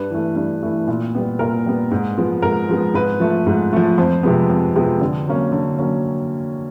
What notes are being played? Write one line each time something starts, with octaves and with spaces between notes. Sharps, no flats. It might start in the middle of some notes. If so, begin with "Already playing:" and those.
Already playing: G2 B4
E3 A3
G2
E3 A3
A#2
G3 B3
A#2 A#4
G3 B3
G#2
F3 G#3 B3
G#2 A#4
F3 G#3 B3
G#2 B4
F3 A3
G#2
F3 A3
F2 C5
C3 F3 G#3 B3
F2
C3 F3 G#3 B3
D3
F#3 A#3 C#4
D3
F#3 A#3 C#4